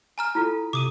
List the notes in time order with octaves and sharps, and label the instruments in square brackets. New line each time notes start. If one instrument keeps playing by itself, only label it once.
[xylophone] G#5 A#5 F6
[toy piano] E4 F4 A4
[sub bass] C3 [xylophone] D6 D#6 D#7